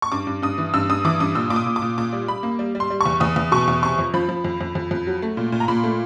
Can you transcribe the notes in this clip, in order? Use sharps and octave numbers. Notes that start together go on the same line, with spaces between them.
C#6
G2 D6
G2
G2 D#6
E3
G2 E6
G2 D#6
E3 D6
G2 D#6
A#2 E6
A#2 D6
D#6
A#2
D6
A#2
A#2 D6
G3
G3 B5
A#3
G3
G3
C6
G3
E2 C#6
E2 D#6
E2
B2 C#6
E2
C3 C#6
F2
F3 B5
F3
F2
F2
F2
F2
F#3
A3
A#2
A#2
A#5
A#2 B5
A3